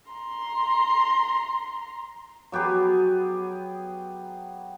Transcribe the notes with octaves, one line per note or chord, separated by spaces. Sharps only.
A#5 C6
F#3 B3 G4 G#4